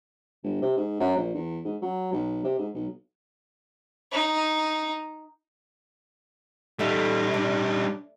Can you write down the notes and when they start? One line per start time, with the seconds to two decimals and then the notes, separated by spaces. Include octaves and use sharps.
0.44 G1
0.62 C3
0.77 G#2
1.00 F#2
1.16 A#1
1.34 E2
1.65 G#2
1.82 F#3
2.13 B1
2.44 C3
2.59 G#2
2.75 B1
4.12 D#4
6.79 G3 D#4 A4 E5
7.34 D4